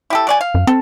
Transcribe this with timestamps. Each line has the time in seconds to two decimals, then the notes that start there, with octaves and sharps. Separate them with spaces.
0.10 E4 G4 A4
0.27 F#3 D5 G#5
0.41 F5
0.54 F#2
0.67 C4 A4